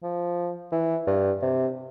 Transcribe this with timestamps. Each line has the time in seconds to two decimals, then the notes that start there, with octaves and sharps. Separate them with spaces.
0.03 F3
0.72 E3
1.07 G2
1.42 C3